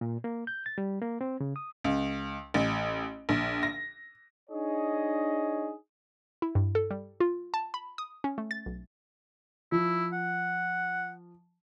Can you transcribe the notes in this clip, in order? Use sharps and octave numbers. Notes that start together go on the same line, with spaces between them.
A#2
A#3
G6
A6
G3
A#3
C4
C#3
D#6
C#2
A1
A#1
A#6
D4 D#4 G#4 C#5 D#5
E4
G2
A4
G3
F4
A5
B5
D#6
C#4
A3
A6
B1
F3 E4
F#5